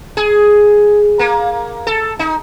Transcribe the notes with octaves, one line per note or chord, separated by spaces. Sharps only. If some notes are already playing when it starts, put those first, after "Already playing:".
G#4
A#3
A4
D#4